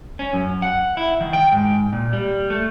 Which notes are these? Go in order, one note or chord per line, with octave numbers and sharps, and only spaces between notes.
C#4
F#2
F#5
E4
D#3
G5
G#2
A#2
G3
A3